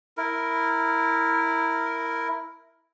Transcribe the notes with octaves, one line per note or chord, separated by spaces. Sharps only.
E4 A#4